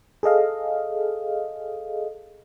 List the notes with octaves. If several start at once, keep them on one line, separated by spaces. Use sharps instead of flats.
G#4 A4 D#5 F5